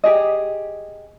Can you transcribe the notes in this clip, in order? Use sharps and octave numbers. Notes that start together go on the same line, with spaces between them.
G4 G#4 D#5